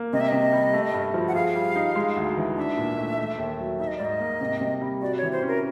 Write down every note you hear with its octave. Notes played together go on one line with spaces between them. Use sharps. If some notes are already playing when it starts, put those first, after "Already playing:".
Already playing: A#3
C3 D#5
E5
C3 D#5
G3
A3
G2
F3
F#5
G#4 F5
G3
D#4
G#3
D2
E3
D4 E5
A#2
A3
A3
D#2
F#3
D#4 E5
D#5
G#2 D5
D#5
A#3
C3
C3
G3
F#4 D5
C#5
E3
C5
C#4
A#4